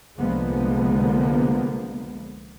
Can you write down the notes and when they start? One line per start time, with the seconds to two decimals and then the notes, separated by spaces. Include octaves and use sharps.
0.19 C2 D3 F3 G#3 A#3 B3